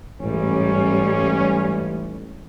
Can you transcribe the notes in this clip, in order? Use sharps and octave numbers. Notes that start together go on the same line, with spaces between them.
A1 G#2 G3 C#4